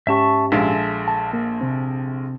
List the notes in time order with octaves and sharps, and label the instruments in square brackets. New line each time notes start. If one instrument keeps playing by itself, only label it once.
[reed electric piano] G#2 C#4 G4 [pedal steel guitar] E5 A5 C#6
[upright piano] A#1 G#3 F5 [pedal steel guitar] A4 E5
[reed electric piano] A5
A#3
C3 C4